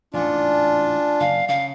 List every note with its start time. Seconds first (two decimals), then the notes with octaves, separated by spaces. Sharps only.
0.14 A1 E2 G#2 D4 F4 D5 G#5 A5
1.20 F#1 F5
1.49 C#3 F5